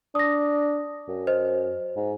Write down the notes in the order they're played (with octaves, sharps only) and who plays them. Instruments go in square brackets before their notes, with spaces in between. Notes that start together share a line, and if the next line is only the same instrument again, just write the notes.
[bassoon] D4 [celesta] D#6 A#6
[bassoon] F#2
[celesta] C5 D#5
[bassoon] G#2